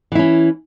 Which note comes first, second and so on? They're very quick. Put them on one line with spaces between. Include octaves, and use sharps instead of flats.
E3 E4 C#4